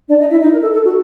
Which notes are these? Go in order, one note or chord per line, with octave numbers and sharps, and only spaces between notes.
D4 D5
D#4 D#5
E4 E5
D#4 D#5
A#4
A4
A4
F#4